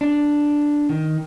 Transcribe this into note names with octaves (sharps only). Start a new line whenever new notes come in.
D4
D#3